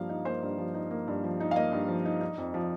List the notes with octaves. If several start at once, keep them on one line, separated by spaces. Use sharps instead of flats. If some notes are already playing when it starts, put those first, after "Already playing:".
Already playing: G2 F3 A#3 F5
D#4
A#3 C5
G2
F3
D#4
A#3
G2
F3
D#4
F5
A#3 D#5
G2
F3
D#4
D#4
F2
F3